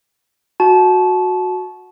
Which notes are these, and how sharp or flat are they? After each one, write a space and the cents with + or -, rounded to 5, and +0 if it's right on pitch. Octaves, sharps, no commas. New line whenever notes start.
F#4 -10 A5 -25